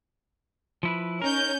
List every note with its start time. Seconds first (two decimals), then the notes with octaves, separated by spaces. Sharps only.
0.83 F3 E4 B4
1.22 C#4 D#4 A#4 G6